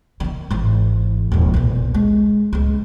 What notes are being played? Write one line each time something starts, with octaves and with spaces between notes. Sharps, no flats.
D3 D#3
G#1 E3
D#1 F2
B1 A#2
G#3
C#2 G#3